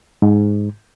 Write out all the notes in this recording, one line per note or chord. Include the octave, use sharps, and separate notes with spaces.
G#2